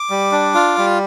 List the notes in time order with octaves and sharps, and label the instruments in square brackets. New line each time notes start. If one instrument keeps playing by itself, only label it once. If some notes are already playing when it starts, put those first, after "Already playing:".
Already playing: [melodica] D6
G3
D4
F4
G3